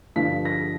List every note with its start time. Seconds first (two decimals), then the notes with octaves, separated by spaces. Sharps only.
0.16 G2 D3 F3 B6
0.45 A#6